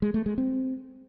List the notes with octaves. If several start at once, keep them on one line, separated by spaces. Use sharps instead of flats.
G#3
A3
G#3
C4